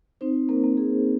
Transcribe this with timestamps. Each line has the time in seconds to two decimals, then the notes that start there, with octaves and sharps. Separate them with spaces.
0.21 C4 D#4 C5
0.49 A#3 A#4
0.64 A#3
0.77 G#4